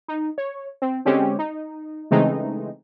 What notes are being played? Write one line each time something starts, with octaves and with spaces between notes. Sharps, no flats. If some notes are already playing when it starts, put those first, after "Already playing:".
D#4
C#5
C4
D3 G#3 C4 C#4 G4
D#4
C#3 E3 G#3 A3 C4 D#4